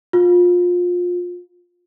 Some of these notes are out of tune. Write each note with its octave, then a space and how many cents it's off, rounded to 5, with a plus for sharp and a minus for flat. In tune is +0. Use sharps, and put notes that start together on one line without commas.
F4 +25